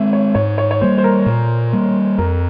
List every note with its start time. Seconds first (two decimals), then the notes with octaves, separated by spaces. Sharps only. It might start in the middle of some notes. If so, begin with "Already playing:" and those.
Already playing: G#3 C4 C#5 E5
0.13 C#5
0.35 G#2 C#5
0.58 C#5
0.71 C#5
0.81 G3 A#3 C5
0.98 C5
1.04 A#4
1.26 A#2
1.73 G3 A#3
2.18 F2 A#4